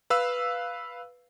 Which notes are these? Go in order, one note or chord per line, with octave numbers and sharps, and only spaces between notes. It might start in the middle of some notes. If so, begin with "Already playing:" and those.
B4 F5 E6